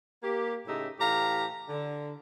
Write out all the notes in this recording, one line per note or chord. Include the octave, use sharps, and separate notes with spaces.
A#3 G4
A2 C#3 D#4 G4 E5
A2 E3 G4 F5 A#5
D3